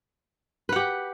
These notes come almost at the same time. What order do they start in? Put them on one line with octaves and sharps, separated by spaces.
B4 F#5 G4